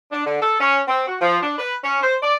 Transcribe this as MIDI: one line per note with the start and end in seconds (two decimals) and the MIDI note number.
0.12 0.23 62
0.26 0.38 50
0.42 0.57 69
0.60 0.79 61
0.88 1.04 60
1.08 1.16 66
1.21 1.37 53
1.42 1.57 62
1.58 1.75 71
1.84 2.01 61
2.02 2.15 72
2.23 2.35 74